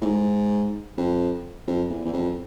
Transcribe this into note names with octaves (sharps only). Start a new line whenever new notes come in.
A2
G#2
F2
F2
E2
E2
F2